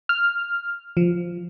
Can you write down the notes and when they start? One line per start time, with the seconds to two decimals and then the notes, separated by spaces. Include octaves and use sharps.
0.09 F6
0.97 F3